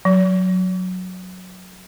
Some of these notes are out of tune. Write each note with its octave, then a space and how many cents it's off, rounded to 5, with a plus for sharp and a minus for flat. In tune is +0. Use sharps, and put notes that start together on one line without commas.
F#3 -10